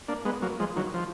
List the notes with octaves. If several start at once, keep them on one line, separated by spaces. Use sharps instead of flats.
A#3 D4
G#3 B3
F#3 A#3
F3 G#3
D#3 F#3
F3